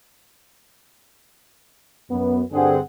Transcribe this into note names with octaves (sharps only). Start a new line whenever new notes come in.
F#2 B3
G2 D3 C4 G#4 F#5